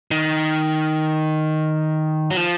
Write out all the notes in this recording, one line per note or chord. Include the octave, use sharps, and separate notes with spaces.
D#3
F#3
F3